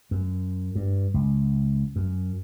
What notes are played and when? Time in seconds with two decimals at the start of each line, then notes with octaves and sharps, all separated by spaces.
0.11 F#2
0.75 G2
1.14 C#2
1.96 F#2